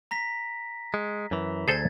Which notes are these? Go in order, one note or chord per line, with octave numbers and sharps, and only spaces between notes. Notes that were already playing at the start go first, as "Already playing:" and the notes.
A#5 A#6 B6
G#3
F#2 E3
D2 G#4 A4 C5 G#6 A6